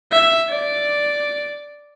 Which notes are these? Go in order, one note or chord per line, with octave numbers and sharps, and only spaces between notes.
E5
D5